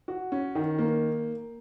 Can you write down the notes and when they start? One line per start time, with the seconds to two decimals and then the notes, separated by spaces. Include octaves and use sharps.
0.08 F#4
0.32 C#4
0.55 D#3
0.79 A#3